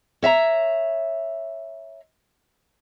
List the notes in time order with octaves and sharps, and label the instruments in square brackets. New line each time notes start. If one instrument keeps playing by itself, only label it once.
[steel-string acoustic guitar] C#5 E5 F5 A#5